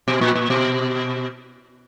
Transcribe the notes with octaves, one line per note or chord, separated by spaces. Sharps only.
B2
A#2
A#2
B2